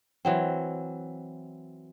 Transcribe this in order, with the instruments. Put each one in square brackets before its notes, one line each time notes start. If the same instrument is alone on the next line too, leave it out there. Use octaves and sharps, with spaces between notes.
[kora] E3 F#3 C4